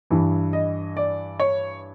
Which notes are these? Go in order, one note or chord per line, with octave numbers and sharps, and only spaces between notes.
G2 E3
D#5
D5
C#5